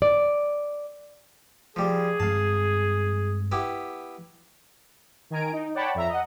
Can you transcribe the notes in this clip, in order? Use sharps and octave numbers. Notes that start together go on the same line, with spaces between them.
D5
F3 G3 G#4
G2 G#3 C4 F5 A5
B3 E4 G4
D#3 G#5 A#5 D7
D#4
C#5 D5 F#5 G5 A5 B5
F2 E5 A#5
D#5 F#5